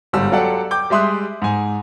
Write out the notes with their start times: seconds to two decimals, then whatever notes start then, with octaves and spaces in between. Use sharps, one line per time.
0.13 G1 G#2 G3 E6
0.32 F#3 F4 G4 A4 D5 F#5
0.71 G5 D6 G6
0.90 G3 G#3 E5 C6 D#6 F#6
1.42 G#2 G#5